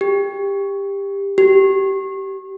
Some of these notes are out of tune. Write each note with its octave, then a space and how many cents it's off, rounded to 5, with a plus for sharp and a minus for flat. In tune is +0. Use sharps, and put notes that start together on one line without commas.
G4 +20
G4 -20